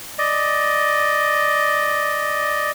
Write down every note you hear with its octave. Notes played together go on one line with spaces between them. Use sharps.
D5 D#5